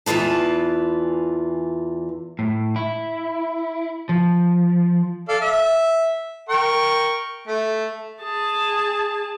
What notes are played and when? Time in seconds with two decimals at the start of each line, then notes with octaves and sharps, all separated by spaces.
0.06 E2 E3 F4 B4 A5
2.39 A2
2.76 E4
4.09 F3
5.28 A4 D5 F5
5.41 E5
6.49 A#4 G5 C#6
7.47 A3
8.22 G#4 A5